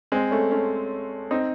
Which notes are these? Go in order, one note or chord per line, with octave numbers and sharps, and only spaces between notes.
G#3 C4
A3 C#4
A3 C#4
C4 D#4